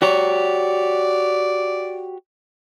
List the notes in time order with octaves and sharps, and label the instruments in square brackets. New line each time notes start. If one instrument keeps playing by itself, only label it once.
[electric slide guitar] F#4 G4 C#5 [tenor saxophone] D5